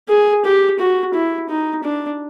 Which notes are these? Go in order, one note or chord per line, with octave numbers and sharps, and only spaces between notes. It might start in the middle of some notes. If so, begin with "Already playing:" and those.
G#4
G4
F#4
E4
D#4
D4